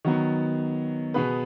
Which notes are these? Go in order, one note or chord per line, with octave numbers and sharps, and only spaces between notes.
D#3 F#3 B3
B2 B3 G#4 B4